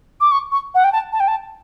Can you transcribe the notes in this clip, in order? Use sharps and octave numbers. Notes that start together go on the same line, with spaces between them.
D6
C#6
C#6
F#5
G5
A5
A5
G5
A5